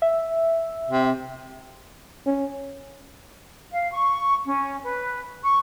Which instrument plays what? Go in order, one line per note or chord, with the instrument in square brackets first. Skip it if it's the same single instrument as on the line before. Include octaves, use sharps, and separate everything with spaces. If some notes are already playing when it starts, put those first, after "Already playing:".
[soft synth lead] E5
[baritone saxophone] C3
[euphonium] C#4
[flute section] F5
C#6
C#4
B4
C#6